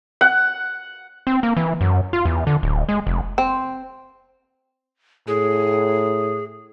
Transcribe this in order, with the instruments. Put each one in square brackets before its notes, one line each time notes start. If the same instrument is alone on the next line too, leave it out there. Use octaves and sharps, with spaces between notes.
[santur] F#5
[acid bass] C4
A#3
E3
F#2
F4
E2
D3
D1
G#3
F1
[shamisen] C4
[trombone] A2 [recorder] G#4